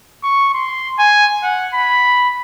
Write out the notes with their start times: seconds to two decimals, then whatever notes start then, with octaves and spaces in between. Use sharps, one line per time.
0.23 C#6
0.54 C6
0.99 G#5
1.43 F#5
1.74 B5